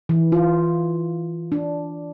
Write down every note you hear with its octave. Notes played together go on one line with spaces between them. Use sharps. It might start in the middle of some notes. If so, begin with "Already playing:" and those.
E3
F4
D4